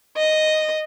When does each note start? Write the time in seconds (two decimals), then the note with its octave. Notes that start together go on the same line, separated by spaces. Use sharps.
0.17 D#5